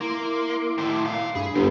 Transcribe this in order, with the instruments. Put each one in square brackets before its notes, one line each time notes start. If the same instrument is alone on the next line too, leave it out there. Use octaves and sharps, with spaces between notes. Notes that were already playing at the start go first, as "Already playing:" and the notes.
[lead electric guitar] A#3 [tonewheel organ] E4 C6 D6
[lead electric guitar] D#2 A2
A#2 F5
[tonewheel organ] G2 D4 B5 [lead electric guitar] G#4
[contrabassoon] G1 [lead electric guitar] C2 G#2